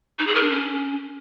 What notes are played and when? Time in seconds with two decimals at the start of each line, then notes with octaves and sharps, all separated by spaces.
0.19 D#4
0.27 G#4
0.35 A#4
0.43 D4
0.51 C#4